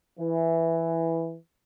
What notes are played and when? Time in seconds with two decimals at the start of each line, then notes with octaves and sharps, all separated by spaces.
0.20 E3